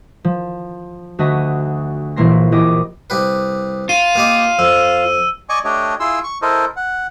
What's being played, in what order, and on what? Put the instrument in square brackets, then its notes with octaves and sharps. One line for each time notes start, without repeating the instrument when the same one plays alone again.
[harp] F3
D2 F#4 D#5 B5 D#7
A#1 A#2 E3 A#3 C6 A#6
E3 G4 D#5 D6
[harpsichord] C2 G4 B4
[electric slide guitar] F4 [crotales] D#7
[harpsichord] A#3 G4 D#5
[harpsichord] F2 [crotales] E6
[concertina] D5 D#5 G#5 C#6 D6
A3 D4 G4 C#5 D#5
E4 F4 G#4 C6 E6
C#6
E4 A4 A#4 C5 D#5
F#5